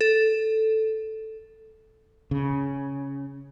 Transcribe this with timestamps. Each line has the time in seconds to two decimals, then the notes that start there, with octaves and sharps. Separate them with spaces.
0.01 A4
2.31 C#3